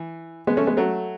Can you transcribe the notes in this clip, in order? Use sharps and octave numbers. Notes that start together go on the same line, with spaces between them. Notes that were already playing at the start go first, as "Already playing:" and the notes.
Already playing: E3
G#3 B3
A3 C#4
G#3 B3
F#3 A3